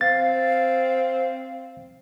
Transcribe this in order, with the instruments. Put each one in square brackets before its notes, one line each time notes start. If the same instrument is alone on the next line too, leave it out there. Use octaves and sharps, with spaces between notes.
[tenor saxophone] C4 [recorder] F5 [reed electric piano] A6